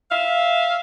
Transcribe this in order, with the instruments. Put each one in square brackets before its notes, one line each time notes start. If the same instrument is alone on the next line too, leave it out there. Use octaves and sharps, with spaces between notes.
[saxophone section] E5 F5